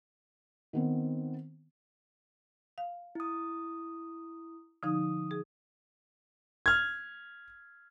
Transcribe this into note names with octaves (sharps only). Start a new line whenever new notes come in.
D#3 B3 C4
F5
E4 D#6
D3 F3 D#4 D#6
G#4
F6 G#6